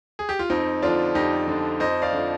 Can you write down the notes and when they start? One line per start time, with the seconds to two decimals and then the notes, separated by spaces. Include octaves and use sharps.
0.19 G#4
0.29 G4
0.39 F4
0.50 F2 C4 D#4
0.82 D3 F3 D4 F4
1.15 F2 D#4 G4
1.48 D3 F3
1.80 F2 C5 D#5
2.02 D5 F5
2.13 D3 F3